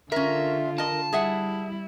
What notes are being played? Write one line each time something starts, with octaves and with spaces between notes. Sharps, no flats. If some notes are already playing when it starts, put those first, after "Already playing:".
D3 C#4 F4 A#4 E5
A#4 D#5 A5
G3 E4 G#4 E5 F#5